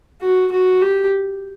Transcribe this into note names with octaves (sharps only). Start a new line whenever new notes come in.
F#4
F#4
G4